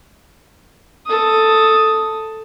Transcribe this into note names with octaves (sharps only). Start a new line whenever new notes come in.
A4 D#6